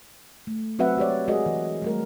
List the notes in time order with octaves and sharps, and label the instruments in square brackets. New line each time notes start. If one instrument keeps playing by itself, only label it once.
[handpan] A3
F#3 C4 F#4 B4 E5 F#5
G#3 G4 C#5 D5
G#3 F#4 G#4 A#4 D#5
E3
G3 A3 A#4